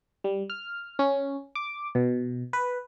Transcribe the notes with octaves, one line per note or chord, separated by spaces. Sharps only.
G3
F6
C#4
D6
B2
B4